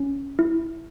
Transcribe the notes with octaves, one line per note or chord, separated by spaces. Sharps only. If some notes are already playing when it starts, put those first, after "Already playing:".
Already playing: C#4
E4